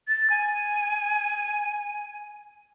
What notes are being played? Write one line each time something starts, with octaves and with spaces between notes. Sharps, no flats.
A6
G#5